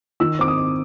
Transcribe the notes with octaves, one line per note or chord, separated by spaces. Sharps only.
D#3 E6
C4 D6
D#6
C4